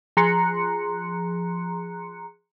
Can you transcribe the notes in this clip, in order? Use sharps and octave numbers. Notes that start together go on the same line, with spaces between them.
F3 G#4 A#5 C6 F#6 C#7